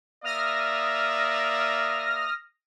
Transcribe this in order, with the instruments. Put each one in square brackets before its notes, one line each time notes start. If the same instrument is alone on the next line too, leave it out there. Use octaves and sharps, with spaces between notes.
[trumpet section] A#3 D5 E5 [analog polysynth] D#6 F6 A#6